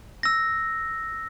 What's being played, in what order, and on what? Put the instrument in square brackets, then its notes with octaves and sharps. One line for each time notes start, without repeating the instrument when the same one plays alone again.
[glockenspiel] E6 A#6